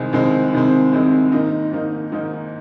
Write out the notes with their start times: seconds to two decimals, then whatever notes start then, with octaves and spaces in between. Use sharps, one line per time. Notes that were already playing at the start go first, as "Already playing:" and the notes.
Already playing: C2 C3 D#3 G#3 C4
0.13 C2 C3 D#3 G#3 C4
0.53 C2 C3 D#3 G#3 C4
0.93 C2 C3 D#3 G#3 C4
1.32 G#2 D#3 A#3 D#4
1.72 G#2 D#3 A#3 D#4
2.12 G#2 D#3 A#3 D#4